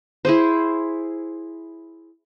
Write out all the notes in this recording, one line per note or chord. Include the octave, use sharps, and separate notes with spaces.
E4 G#4 C5